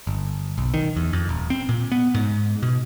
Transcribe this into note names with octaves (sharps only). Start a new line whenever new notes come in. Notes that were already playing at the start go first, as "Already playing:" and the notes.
G1
B1
D#3
E2
F2
D#1
C4
A#2
B3
G#2
B2